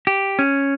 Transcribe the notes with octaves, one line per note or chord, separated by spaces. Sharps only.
G4
C#4